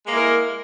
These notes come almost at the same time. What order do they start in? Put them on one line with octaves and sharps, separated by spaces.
G#3 A#3 E4 A#4